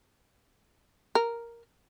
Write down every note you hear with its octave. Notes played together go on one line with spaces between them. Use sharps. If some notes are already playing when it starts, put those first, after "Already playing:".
A#4